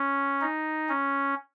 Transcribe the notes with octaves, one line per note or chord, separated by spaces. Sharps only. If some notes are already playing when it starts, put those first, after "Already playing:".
Already playing: C#4
D#4
C#4